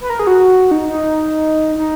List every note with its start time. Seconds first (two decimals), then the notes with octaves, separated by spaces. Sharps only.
0.01 B4
0.10 A#4
0.19 G#4
0.27 F#4
0.71 D#4
0.89 D#4
1.76 D#4